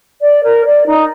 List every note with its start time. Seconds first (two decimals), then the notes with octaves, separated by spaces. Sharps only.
0.21 D5
0.43 A#4
0.65 D5
0.86 D#4